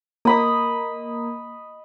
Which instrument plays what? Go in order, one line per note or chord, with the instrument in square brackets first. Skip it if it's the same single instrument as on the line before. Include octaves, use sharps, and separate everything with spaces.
[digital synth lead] A#3 [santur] D#5 B5 D#6